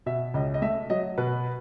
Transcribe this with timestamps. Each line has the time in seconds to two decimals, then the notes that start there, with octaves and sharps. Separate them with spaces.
0.06 B2 E5
0.34 C#2 D#5
0.54 D#5
0.62 A3 E5
0.90 F#3 D#5
1.18 B2 B4